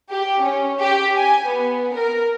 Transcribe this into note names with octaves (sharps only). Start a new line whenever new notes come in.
G4
C#4
G4
G#5
B3
A#4